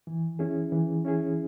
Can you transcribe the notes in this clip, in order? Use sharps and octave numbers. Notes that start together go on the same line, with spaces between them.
E3
C#4 E4 G#4
E3
C#4 E4 G#4